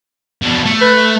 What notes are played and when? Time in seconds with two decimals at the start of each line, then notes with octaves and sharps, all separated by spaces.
0.42 B2 D4
0.66 A3
0.82 B4